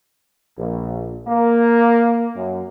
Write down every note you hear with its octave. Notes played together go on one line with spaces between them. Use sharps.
A#1
A#3
F#2